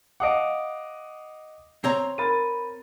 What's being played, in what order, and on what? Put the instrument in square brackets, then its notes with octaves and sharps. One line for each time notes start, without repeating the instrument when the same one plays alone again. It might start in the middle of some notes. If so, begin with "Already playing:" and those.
[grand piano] D#5 F5 F#5 [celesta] D6 D#6 D7
[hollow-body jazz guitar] C4 C#5 A#5
[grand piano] A#4 A6 [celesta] B5 D#7